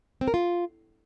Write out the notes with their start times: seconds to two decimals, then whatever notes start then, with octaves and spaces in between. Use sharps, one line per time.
0.21 C4
0.28 A#4
0.34 F4